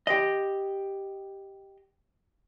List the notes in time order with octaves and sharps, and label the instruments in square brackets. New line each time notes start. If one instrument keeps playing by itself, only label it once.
[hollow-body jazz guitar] G4 D#5